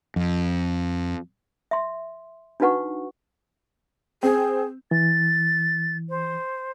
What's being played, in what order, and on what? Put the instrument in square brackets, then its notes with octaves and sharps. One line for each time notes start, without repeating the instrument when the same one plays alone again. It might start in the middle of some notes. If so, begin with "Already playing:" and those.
[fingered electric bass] F2
[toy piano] E5 C6
D4 D#4 F#4 B4 F#5 C#6
[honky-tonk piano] C4 [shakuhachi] G#4
[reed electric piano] E3 [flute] A6
[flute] C5